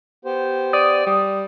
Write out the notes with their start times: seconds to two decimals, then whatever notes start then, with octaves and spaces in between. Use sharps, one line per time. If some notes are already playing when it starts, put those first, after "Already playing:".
0.25 B3 G4 C5
0.73 D5 D#6
1.07 G3